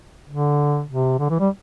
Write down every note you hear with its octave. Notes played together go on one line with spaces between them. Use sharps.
D3
C3
D3
E3
G3